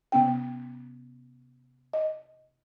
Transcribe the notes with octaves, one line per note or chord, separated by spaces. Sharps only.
C3 B3 C#4 G5
D#5